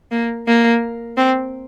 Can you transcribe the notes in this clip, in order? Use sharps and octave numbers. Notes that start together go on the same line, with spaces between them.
A#3
A#3
C4